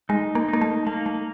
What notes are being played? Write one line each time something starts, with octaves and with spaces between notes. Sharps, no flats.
G#3 D#4
A#3
A#3 D#4
A3
A3 A#3
A3